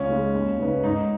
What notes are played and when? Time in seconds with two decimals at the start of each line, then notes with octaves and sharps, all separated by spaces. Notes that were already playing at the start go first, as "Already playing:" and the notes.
Already playing: C#2 C#4
0.09 C#3 G#3
0.33 D#2
0.58 C#3 B3 D#4 B4
0.84 G#2 D#4